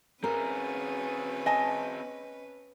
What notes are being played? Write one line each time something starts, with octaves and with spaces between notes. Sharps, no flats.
C4 C#4 G#4 A#4 B4
D#5 G#5 A5